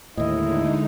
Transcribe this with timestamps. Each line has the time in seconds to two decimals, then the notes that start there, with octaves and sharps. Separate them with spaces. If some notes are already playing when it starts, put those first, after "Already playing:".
0.17 D#2 A2 D3 G#3 D#4 E4 D#5